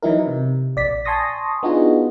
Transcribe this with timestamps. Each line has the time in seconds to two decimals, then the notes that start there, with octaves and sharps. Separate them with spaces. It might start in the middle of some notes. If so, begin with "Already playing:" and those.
0.03 E3 F#3 D#4 E4 A#4
0.27 C3
0.76 A#1 D5 B6
1.05 G#5 A5 C6 C#6 D#6 A#6
1.63 B3 D4 D#4 F4 F#4 G#4